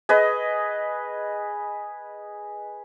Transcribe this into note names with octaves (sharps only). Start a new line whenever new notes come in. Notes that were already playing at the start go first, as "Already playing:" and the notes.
G#4 B4 D#5